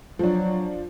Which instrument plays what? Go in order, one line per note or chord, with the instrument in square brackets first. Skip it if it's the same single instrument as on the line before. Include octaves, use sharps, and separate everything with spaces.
[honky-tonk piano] F3 D4 [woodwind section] F#3